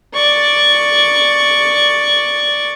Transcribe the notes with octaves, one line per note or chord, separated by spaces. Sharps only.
D5 C#6